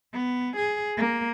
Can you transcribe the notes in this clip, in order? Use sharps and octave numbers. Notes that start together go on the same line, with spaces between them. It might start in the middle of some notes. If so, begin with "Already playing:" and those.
B3
G#4
A#3